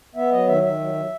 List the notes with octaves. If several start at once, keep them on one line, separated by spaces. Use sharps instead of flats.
B3 E5
F#3 D#5
D#3 E5
D#3 E5
F#3
F#3